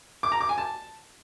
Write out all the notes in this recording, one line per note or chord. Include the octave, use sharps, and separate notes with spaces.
D6
A#5
D6
G#5
A5